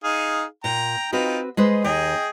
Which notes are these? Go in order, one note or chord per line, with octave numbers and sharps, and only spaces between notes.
D#4 G#4 F5
A#2 G5 A#5
C4 D#4 F4 F#4 B4 G5
G#3 B4 C5 D#5
D#2 G#4 D#5 G5